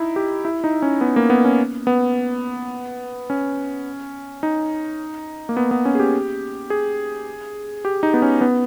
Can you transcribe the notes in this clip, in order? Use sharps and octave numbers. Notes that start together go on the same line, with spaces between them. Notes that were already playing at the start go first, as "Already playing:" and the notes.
Already playing: D#4 E4
G4
E4
D#4
C#4
B3
A#3
B3
C#4
B3
C#4
D#4
A#3
B3
B3
C#4
G#4
G4
G#4
G4
D#4
B3
C#4
B3